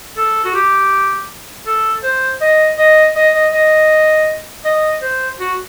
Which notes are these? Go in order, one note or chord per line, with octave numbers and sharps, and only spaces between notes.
A4
F#4
G4
A4
C5
D#5
D#5
D#5
D#5
D#5
D#5
C5
F#4